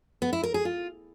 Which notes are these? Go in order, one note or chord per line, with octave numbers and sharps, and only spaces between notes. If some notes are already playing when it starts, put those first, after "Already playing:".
B3
E4
A#4
G#4
F4